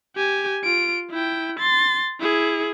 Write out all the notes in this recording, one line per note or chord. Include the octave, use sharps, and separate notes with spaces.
G4 G#5
F4 D7
E4 G5
C6 A6
E4 G#4